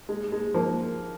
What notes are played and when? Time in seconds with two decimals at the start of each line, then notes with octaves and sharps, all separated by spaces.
0.09 G#3
0.32 G#3
0.54 F3 A#3